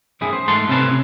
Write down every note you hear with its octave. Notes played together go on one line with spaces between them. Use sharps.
B1 F#2 A2 E4 G#4
C5
G#2 A3 F#5 A5 C6
A2 C3 C4 C#4 B4 A5
C3